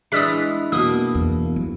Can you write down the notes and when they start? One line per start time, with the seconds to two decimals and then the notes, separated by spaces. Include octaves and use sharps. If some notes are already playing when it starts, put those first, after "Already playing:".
0.12 E3 G#3 D4 D#6 E6 B6
0.72 B2 A#3 D#6
1.15 E2
1.56 F2